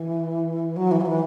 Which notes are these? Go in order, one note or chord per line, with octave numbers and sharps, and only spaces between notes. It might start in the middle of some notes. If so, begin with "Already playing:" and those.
Already playing: E3
F#3
E3
F#3
E3